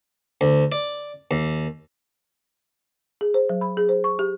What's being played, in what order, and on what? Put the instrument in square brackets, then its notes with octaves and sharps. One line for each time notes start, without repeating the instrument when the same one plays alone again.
[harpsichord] D2
D5
D#2
[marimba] G#4
C5
F#3
B5
G#4
C5
C#6
G4